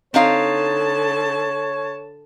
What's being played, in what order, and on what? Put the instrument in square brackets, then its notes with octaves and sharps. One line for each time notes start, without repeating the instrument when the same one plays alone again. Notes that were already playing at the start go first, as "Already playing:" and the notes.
[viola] D3 A5 [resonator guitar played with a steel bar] C4 D#4 F5 [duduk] C#5